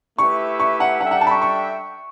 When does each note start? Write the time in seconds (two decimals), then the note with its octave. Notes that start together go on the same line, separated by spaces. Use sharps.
0.18 A3 E4 G4 B4 E5 C#6
0.60 C#6
0.80 F#5
1.00 G3 D4 A4 E5 F#5 G5
1.11 F#5
1.21 A5
1.27 B5
1.31 C#6
1.42 C#6